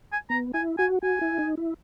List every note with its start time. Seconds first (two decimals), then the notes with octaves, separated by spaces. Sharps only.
0.12 G#5
0.30 B3 A#5
0.54 E4 G#5
0.78 F#4 G#5
1.03 F#4 G#5
1.21 E4
1.39 D#4
1.57 E4